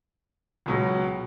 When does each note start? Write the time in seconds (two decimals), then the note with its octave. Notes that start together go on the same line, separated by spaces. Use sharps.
0.66 C#2 B2 F#3